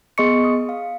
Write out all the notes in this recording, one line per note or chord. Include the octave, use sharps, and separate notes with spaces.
B3 G#4 D#5 C6 C#6 C#7
D#6
F5